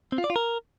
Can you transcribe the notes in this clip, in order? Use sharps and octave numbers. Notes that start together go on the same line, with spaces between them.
C4
F4
D5
F4
A#4